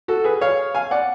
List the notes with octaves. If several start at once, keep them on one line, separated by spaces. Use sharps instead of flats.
F#4 A4
G#4 B4
C#5 F5
F5 G#5
D5 F#5